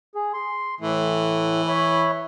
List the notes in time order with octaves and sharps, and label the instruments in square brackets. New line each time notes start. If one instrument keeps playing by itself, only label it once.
[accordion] G#4
C6
[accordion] A2 A3 [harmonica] E3
[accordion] C#5 E5 B5